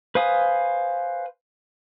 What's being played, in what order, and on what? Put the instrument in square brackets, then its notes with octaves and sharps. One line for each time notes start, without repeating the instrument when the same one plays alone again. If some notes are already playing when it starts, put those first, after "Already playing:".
[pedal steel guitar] B4 C5 F5 G#5 D#6